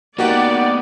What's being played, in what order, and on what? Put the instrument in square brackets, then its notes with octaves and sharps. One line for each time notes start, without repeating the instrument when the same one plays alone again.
[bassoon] D#3 [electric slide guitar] A#3 B3 [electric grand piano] F#4 G4 F#5 [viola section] D5